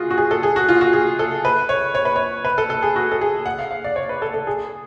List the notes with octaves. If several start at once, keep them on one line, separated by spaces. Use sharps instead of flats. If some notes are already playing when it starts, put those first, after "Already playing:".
Already playing: F4 F#4 G#4
F#4
G#4
A4
G#4
F#4
F4
F#4
G#4
A4
B4
C#5
C#5
B4
C#5
B4
A4
A4
G#4
F#4
A4
G#4
F#5
F5
F5
D5
C#5
B4
A4
A4
G#4